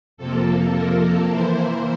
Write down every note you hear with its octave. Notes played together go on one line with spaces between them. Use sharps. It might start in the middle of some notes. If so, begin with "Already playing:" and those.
F2 C3 F3 A#3 A4
A#4
E3 A#3 E4 C5